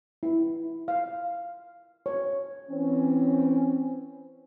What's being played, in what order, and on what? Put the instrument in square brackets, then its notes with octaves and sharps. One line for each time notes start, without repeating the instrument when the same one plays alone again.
[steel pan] E4
F5
C#5
[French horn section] E3 C4 C#4